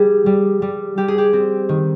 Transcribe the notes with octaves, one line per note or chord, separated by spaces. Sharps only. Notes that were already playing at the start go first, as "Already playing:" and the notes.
Already playing: G3 G#4
G3
G3
G3 G4
G#4
G4
C4
D#3